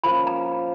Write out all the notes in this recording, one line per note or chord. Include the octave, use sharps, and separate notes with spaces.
F3 A#3 C#4 B5
A#5